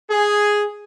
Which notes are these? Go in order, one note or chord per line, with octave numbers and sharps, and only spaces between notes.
G#4